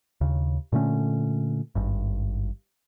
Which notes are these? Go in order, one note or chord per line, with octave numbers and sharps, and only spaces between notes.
D#2 C#3
A#2 D3 A3 C#4
G#1 G2